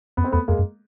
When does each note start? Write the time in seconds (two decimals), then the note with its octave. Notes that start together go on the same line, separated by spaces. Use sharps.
0.17 F2 B3
0.24 C4
0.32 E2 A3 B3
0.48 F2 G#3 A#3
0.59 F#2